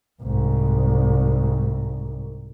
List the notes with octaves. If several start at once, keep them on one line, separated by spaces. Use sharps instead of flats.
C2 G#2